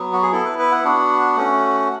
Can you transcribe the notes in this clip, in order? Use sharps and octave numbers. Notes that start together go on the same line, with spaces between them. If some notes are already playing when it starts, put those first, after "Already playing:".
Already playing: F#3 B3
F#4
G#4
B3 E4 A4
B4
B4
F#5
B3 D4 F#4
A3 C#4 F#4